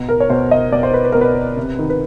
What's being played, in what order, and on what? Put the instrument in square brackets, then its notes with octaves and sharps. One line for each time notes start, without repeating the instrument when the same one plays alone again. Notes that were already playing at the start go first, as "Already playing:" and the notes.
Already playing: [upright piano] B2
A#4
C#5
B2 C5
D#5
B2 D5
C5
B4
B4
B2 A#4
B4
C3
D#3
B4